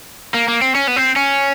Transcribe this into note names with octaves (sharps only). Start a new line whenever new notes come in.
A#3
A#3
C4
C#4
B3
C4
C#4